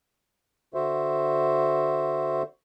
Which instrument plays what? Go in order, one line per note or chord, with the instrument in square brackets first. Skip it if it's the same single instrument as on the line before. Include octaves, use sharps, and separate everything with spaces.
[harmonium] D3 F#4 C5 E5